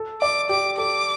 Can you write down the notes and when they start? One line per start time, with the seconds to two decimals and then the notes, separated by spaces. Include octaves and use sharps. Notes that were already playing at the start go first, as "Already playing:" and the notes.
Already playing: A4
0.21 D5 D6
0.49 G4 D6
0.78 A4 D6